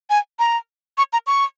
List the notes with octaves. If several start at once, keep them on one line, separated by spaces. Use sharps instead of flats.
G#5
A#5
C#6
A#5
C#6